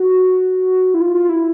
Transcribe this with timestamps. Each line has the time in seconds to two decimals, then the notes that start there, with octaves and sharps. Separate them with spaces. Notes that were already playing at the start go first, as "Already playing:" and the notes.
Already playing: F#4
0.94 E4
1.01 F4
1.15 F4
1.29 E4